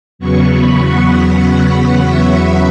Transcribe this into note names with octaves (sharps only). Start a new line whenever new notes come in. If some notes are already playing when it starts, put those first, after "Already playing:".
E2 C#3 F#3 B3 C#6
B5
F#5
E5